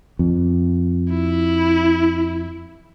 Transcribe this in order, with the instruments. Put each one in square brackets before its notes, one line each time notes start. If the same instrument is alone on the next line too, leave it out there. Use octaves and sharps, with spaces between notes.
[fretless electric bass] F2
[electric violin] E4